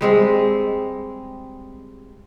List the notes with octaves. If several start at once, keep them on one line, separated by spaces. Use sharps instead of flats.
G3 G#3 C4